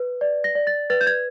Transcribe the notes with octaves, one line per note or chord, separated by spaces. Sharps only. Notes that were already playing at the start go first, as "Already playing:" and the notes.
Already playing: B4
D5
A#6
D5
A6
B4 A6
G6
G#6